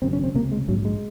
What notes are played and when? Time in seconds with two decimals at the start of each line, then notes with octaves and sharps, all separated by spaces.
0.02 G#1 F#2 C#3 C4
0.13 C#4
0.24 C4
0.35 C#2 C3 A#3
0.52 G#3
0.68 A#1 G#2 F#3
0.85 G#3